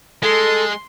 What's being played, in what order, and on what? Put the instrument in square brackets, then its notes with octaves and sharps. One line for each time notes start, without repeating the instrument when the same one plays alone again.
[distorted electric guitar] G#3 [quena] A4 [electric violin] C6